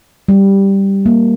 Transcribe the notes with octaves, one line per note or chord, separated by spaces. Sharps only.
G3
A#3